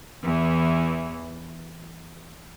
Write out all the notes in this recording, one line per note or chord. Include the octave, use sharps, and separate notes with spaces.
E2 E3